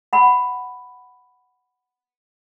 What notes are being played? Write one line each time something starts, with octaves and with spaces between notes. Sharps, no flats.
F#5 B5